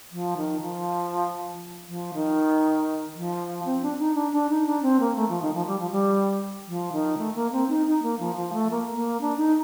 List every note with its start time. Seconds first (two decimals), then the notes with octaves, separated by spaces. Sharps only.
0.12 F3
0.37 D#3
0.61 F3
1.89 F3
2.14 D#3
3.15 F3
3.65 C4
3.82 D4
3.99 D#4
4.15 D4
4.32 D4
4.49 D#4
4.66 D4
4.82 C4
5.00 A#3
5.16 A3
5.29 F3
5.42 D#3
5.54 F3
5.67 G3
5.79 F3
5.91 G3
6.67 F3
6.93 D#3
7.18 A3
7.35 A#3
7.52 C4
7.69 D#4
7.86 D#4
8.03 A#3
8.19 F3
8.36 F3
8.53 A3
8.70 A#3
8.95 A#3
9.21 D4
9.37 D#4